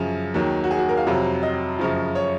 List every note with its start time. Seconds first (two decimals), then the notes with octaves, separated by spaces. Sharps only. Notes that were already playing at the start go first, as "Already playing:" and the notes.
Already playing: F#2 C#3 F3 G#4
0.34 D#2 D#3 F#3
0.64 F#4
0.71 G#4
0.79 F#4
0.89 A#4
0.97 F5
1.07 F2 C3 F#3
1.43 D#5
1.79 F#2 C#3 F3
2.15 C#5